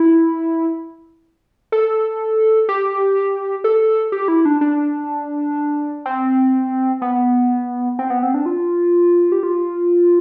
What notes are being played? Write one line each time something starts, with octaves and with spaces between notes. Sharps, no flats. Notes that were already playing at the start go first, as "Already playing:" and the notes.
Already playing: E4
A4
G4
A4
G4
E4
D4
D4
C4
B3
C4
B3
C4
D4
F4
G4
F4